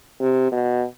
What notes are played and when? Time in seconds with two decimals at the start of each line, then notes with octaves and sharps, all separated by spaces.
0.20 C3
0.52 B2